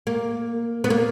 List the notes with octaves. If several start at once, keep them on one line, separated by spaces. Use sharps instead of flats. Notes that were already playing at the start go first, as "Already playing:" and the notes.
A#3
B3
A#3